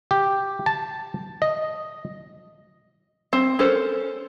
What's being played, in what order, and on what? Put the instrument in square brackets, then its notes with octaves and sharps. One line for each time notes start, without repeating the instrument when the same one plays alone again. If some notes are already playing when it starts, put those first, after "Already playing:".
[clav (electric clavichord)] G4
A5
D#5
[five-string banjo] C4
C#4 A4 A#4 C5